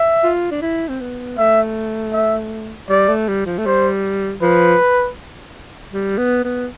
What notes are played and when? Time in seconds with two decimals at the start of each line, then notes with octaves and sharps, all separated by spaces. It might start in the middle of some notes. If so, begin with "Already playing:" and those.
Already playing: E5
0.24 F4
0.51 D4
0.62 E4
0.89 C4
1.00 B3
1.38 A3 E5
2.13 E5
2.89 G3 D5
3.08 A3
3.28 G3
3.46 F3
3.58 A3
3.66 G3 C5
4.41 F3 B4
5.93 G3
6.18 B3
6.44 B3